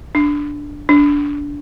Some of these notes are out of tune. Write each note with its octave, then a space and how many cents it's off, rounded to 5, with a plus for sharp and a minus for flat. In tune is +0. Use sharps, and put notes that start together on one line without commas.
D4 -5
D4 -20